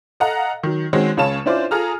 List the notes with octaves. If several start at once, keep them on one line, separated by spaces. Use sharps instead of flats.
A4 D#5 F5 F#5 A#5
D#3 F#3
D#3 G#3 C4 C#4 F#4
C#2 C#3 C#4 C#5 A5 E7
C#4 D4 E4 F4 C5 D5
F4 G#4 A4 A#5 D#6 F6